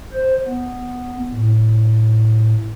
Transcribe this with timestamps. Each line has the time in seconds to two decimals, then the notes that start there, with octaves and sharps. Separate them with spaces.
0.13 C5
0.46 B3
1.30 A2